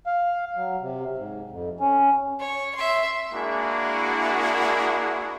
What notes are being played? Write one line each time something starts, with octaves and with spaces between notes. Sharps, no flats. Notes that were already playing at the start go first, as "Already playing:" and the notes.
F5
F#3
C3
G#2
F2
C#4
C#5
E5 C6
G#3 A#3 D4 E4 F#4 G#4